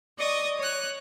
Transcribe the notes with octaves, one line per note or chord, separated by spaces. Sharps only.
D5 D#5 C#6 D#6
C#5 F#6